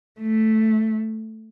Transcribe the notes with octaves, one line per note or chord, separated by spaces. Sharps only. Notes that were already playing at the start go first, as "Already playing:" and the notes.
A3